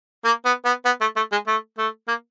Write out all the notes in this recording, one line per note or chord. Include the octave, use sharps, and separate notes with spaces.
A#3
B3
B3
B3
A3
A3
G#3
A3
A3
A#3